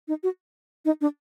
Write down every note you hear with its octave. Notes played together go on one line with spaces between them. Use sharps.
D#4
F#4
D#4
D4